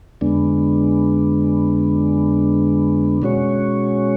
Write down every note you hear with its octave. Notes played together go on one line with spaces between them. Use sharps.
F2 D3 G#3 B3 D4
B2 G#3 C#4 F#4 C#5